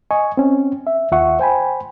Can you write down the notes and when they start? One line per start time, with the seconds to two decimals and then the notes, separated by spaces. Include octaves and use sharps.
0.11 D#5 G#5 C#6
0.37 C4 C#4
0.87 E5
1.12 D#2 F4 E5 F#5 C#6
1.39 C5 G5 G#5 B5